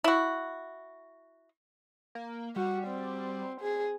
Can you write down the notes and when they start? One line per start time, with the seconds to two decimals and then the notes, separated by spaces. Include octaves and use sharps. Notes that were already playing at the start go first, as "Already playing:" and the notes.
0.04 E4 F#4
2.15 A#3
2.56 G3 F#4
2.87 C4
3.61 G#4